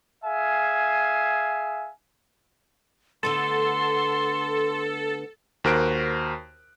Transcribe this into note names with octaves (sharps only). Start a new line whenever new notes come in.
G#4 E5 F5 G#5
D3 A3 B3 A4 C6
D#2 F#4 A#4 C5 F#6 D7